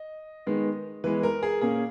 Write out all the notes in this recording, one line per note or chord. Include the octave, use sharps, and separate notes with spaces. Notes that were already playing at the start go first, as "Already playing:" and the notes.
Already playing: D#5
D#3 G#3 B3
E3 G#3 B3 B4
A#4
G#4
A#2 A#3 C#4 G#4